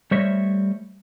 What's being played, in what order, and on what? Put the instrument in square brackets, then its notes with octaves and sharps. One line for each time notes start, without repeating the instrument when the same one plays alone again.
[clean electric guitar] G3 A3 C5 C#5 D#5 E5